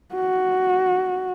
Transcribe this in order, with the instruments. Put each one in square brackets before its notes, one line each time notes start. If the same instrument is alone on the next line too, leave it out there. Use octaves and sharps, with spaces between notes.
[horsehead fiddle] F#4